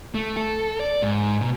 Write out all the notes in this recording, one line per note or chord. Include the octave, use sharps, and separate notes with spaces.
A3
A4
D5
G#2
B2